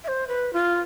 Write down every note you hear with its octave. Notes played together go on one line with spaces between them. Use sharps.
E5
C5
B4
F4